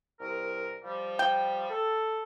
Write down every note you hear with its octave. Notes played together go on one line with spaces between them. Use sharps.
C2 A#4
F3 G3
G5
A4